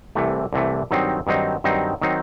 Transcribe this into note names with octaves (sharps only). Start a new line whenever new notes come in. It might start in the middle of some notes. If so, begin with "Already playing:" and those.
C2 C3 E3 A3
C2 C3 E3 A3
G2 D#3 F#3 C4 D#4
G2 D#3 F#3 C4 D#4
G2 D#3 F#3 C4 D#4
D#3 F#3 C4 D#4